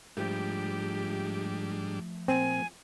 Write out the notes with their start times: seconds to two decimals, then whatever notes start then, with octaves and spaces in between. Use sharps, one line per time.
0.17 G#2 F3 G3 A3 D4 G4
2.28 A#2 C4 G#5